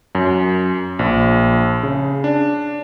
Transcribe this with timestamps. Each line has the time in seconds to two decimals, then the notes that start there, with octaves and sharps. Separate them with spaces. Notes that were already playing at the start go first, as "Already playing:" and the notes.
0.15 F#2
0.99 A#1
1.83 C#3
2.24 D4